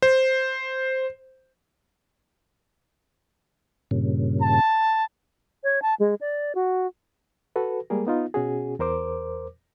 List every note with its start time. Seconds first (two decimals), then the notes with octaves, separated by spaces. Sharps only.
0.02 C5
3.91 G2 A#2 C#3
4.40 A5
5.64 C#5
5.82 A5
6.00 G#3
6.21 D5
6.55 F#4
7.56 F#4 A4 B4
7.90 G3 G#3 A#3 G#4 A#4
8.07 B3 D#4 F4
8.34 B2 C#4 F#4 G#4
8.79 E2 A#4 C5 D6